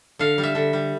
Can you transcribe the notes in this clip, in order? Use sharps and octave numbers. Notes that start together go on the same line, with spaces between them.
D3 F5
G3
E5
D3
G3